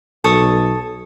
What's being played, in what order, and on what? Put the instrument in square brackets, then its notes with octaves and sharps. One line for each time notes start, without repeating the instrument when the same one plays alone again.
[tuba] B1 [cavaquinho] A4 C#5 D#6